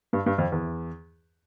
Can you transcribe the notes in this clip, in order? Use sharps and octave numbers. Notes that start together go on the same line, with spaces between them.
G2
G2
F2
E2